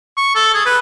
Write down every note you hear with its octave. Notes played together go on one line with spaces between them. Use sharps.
C#6
A4
G#4
B4